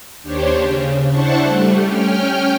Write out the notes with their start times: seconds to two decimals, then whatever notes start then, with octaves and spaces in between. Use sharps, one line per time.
0.23 D#2 D4 G4 C5 C#5
0.55 C#3
1.08 D4 E4 C5 F#5 A5 C#6
1.40 G3 A3
1.81 C#4 G5 F6